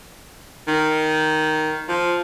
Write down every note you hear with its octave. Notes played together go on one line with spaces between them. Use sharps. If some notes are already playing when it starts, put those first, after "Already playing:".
D#3
F3